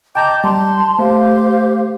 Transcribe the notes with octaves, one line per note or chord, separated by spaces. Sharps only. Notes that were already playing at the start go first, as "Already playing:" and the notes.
D#5 G5 A5 A#5 D6 G6
G3 A5 C6
A3 G4 C5 F5